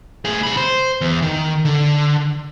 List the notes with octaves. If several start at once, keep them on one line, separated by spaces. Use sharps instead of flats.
A2 G#4
C3 B5
C5
E2
D#3
D3